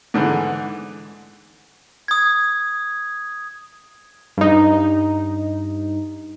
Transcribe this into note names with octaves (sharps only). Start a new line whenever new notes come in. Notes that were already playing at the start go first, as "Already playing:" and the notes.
G#2 D3 E3
D#6 G#6
G2 D#4